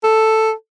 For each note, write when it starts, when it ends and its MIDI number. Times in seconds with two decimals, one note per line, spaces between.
0.04 0.52 69